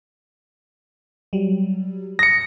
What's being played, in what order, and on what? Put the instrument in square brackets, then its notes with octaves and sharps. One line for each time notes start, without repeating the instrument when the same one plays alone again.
[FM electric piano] F#3 G3
[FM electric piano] D#6 [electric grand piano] A#6 C#7